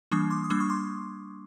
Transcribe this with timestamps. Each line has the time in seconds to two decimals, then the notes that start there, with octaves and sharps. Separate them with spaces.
0.11 E3 G3 A#3 D4 C#6 D#6
0.30 C6 D6
0.44 D#6
0.50 G3 A#3 D4 D6 E6
0.60 C#6 D#6
0.70 C6 D6